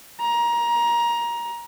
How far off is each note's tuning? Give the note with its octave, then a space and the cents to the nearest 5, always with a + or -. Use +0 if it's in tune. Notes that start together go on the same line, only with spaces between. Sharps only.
A#5 +20